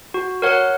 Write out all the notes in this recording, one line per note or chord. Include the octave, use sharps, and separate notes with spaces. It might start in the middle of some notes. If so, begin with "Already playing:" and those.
F#4
A#4 C#5 F#5